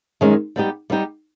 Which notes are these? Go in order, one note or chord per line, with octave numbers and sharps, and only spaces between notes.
F#2 D#3 G#3 C#4
G3 B3 D#4 G4
G3 B3 D#4 G4